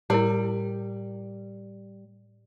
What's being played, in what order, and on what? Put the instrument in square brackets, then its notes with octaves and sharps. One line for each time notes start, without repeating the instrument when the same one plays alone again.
[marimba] A2 [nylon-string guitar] G3 [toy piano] E4 A#4 C#5